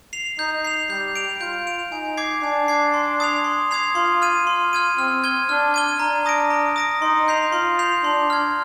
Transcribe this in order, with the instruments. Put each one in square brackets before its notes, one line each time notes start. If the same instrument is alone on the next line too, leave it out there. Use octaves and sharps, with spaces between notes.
[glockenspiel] C7 F7
[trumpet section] D#4 [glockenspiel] G6
[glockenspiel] C7 F7
[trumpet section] G3 G4 [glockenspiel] G6
[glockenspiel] D7 F7
[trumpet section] F4 [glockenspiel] G6
[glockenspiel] D7 F7
[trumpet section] D#4 [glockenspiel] G#5
[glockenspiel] D6 G#6 C7
[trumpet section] D4 [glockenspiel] G#5
[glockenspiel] D6 G#6 C7
C6
D#6 G#6 C7 F7
C6
D#6 G#6 C7 F7
[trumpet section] F4 [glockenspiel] C6
[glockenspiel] F6 G#6 D#7
[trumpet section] F4 [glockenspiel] C6
[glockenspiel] F6 G#6 D#7
[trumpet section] C4 [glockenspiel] F6
[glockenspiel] G#6 D#7 G7
[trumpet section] D4 [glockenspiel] F6
[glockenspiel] G#6 D#7 G7
[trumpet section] D4 [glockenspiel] A#5
[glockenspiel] D#6 A#6 D7
A#5
D#6 A#6 D7
[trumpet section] D#4 [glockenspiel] C6
[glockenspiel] G6 C7 F7
[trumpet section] F4 [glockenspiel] C6
[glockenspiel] G6 C7 F7
[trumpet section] D4 [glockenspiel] C6
[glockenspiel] F6 G#6